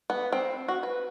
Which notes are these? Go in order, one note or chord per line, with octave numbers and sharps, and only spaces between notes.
B3
C4
F#4
B4